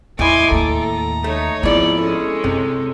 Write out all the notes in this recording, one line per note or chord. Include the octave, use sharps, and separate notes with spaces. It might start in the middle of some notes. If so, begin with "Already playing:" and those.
E2 A2 E4 D#5 G#5 C6 D6
D#2 A4 A#5
A3 D#4 C#5
G#2 F3 B3 C4 E4 D5
G#3 C#4 A4
F#2 C3